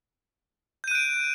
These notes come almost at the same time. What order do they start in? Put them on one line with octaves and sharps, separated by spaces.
G6 D#7 F#6 D7